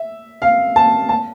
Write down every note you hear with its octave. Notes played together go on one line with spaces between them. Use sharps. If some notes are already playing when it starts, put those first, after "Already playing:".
Already playing: E5
F5
A5
A5